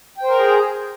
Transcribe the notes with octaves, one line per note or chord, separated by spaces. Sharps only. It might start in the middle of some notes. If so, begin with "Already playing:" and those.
G#4 A#4 C5 G5 A#5